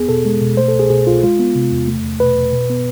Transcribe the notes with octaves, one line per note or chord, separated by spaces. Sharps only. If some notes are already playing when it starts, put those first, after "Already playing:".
Already playing: E2 B3 G#4
B2 A4
G#3
B2
A3 C5
A4
C2
G#4
B2 G#4
C2 F4
G#3 F4
B3
C3
E2
A3
E2
B2 B4
E2
B2
B3